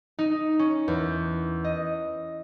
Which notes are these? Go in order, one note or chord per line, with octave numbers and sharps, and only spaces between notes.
D#4
C#4
E2
D#5